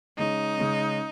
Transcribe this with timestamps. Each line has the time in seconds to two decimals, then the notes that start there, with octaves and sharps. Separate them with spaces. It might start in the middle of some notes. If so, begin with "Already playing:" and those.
0.18 C#3 G#3 C#4 D#4
0.58 C#3 G#3 C#4